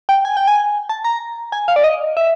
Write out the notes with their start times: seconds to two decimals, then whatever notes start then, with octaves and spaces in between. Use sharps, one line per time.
0.09 G5
0.25 G#5
0.37 G5
0.48 G#5
0.89 A5
1.05 A#5
1.52 G#5
1.68 F5
1.76 D5
1.84 D#5
2.17 E5